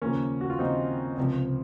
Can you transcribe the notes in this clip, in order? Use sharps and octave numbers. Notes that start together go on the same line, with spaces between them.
D#2 C#3 F3 A#3 C#4
F#4
F4
D#2 C#3 F3 C4 D#4
C#2 C3 F3